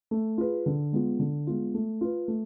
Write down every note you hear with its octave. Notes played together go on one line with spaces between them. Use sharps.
A3
F4 G#4 B4
D3
G#3 B3 F4
D3
G#3 B3 F4
A3
F4 B4
A3